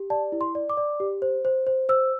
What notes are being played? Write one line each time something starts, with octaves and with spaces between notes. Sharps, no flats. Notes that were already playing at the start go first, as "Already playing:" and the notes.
Already playing: G4
D5 A5
E4
C6
D5
D6
D5
G4
C5
C5
C5
C5 E6